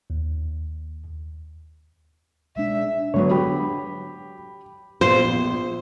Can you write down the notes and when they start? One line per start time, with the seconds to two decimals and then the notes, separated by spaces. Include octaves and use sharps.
0.10 D#2
2.56 B2 G#3 D4 E5
3.14 D3 F#3 B3 C#5
3.31 G4 B5
5.01 A#1 B3 F4 C5